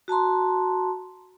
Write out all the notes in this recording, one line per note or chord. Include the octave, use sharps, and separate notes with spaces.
F#4 A5 A#5 C6